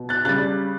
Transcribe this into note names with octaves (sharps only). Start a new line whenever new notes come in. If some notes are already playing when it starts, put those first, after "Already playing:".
Already playing: B2
F#6 A6
C#3 G3 F#6 A6